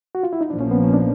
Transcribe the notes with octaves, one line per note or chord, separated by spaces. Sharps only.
F#4
F4
E4
D#4
A#1 A#2 F3 A#3 D4
C#4
B3
C#4
D4